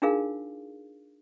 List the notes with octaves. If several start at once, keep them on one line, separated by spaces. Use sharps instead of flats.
D4 D#4 F4 G#4 A#4 F5